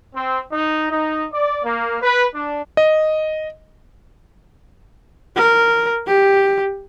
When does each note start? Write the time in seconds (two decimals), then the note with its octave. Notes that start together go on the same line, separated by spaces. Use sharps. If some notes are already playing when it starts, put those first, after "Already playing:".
0.14 C4
0.52 D#4
0.90 D#4
1.32 D5
1.63 A#3
2.01 B4
2.34 D4
2.77 D#5
5.36 A#4
6.07 G4